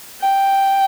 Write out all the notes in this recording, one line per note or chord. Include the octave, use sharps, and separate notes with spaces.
G5